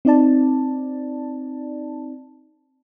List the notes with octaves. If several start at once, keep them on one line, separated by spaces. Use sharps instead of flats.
C4 D#4 D5 A5